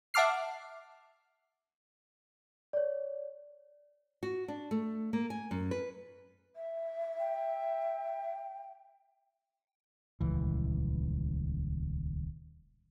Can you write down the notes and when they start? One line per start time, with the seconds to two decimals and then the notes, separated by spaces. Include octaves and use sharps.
0.14 E5 F#5 A5 D6 F6 C7
2.73 C#5 D5
4.23 F#4
4.48 D4
4.71 A3
5.13 A#3
5.30 G#5
5.51 F#2
5.71 B4
6.56 E5
7.19 G5
10.21 D#1 C#2 E3